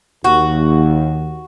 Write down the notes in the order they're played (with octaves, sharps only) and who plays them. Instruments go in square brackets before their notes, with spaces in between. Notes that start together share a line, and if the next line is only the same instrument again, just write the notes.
[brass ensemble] D#2 [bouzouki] F#4